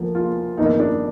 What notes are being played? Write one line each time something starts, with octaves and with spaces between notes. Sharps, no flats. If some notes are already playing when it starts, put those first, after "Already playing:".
Already playing: D2 D3 F3 A#3
F4
G1 F2 D#3 A#3 D#4
D4